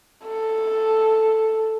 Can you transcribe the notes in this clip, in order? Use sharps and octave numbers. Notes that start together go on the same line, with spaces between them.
A4